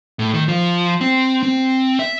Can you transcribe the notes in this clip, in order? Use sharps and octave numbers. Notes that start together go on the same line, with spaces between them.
A2
D#3
F3
C4
C4
E5